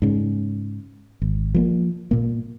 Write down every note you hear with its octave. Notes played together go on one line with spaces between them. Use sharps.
G#2 C#3
G#1
F3 A3 A#3
A#2 A#3